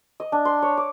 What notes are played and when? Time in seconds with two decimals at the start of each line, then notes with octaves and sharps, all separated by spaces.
0.20 D#5
0.32 D4
0.45 C6
0.62 C#5
0.77 D6